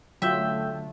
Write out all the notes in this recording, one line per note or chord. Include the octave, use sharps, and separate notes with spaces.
D3 F#3 A3 F4 E5 G5 E6 G6